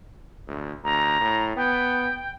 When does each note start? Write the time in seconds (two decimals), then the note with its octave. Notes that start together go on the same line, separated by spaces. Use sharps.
0.48 D2
0.84 D2 A#5
1.20 A2
1.57 B3 G5